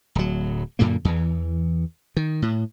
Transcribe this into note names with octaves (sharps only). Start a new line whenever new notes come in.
D1 F#3
F#2 A#2 D3 A#3
E2 E3
D#3
A2